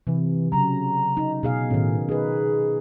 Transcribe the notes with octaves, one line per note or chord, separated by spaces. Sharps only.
C3 E3
C#3 F#3 A#5
D#4
B2 G#4 F5
A2 D#3 C#4
D#4 G#4 B4